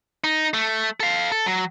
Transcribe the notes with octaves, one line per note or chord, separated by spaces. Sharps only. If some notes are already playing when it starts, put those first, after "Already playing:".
D#4
A3
A4 F5
A4
F#3